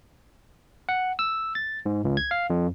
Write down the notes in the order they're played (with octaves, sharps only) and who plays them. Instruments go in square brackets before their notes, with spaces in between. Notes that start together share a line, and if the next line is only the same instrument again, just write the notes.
[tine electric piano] F#5
E6
A6
G#2
C#2
G#6
F5
F2